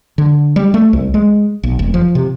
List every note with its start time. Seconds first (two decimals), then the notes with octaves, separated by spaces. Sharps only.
0.18 D3
0.56 G3
0.74 A3
0.93 C2
1.14 G#3
1.63 B1
1.79 F1
1.94 F3
2.15 C3